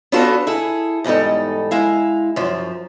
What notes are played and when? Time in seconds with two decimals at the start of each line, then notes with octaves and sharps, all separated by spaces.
0.12 B3 C#4 D4 F4 F#4 A4
0.47 E4 G#4 A4
1.04 E2 G#2 G3 D#4 A4
1.71 G#3 E4 F5
2.36 F#2 F3